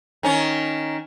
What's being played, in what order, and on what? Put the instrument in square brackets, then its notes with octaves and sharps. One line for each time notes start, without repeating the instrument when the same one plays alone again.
[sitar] D#3 C#4